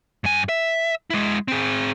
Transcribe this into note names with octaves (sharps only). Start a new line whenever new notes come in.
G2 G#5
E5
G#3 E4
C4 G#4